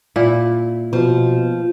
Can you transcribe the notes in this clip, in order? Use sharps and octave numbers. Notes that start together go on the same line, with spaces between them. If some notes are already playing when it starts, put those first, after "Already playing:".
A#2 E4
B2 F3